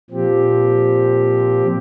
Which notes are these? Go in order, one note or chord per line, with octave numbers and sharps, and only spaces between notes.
A#2 F3 C4 G4